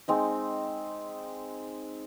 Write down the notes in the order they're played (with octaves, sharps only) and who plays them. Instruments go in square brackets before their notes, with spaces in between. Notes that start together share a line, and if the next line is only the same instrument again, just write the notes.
[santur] G#3 C4 D#4